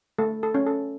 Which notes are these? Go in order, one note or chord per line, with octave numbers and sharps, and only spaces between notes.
A3 A4
A4
C#4
A4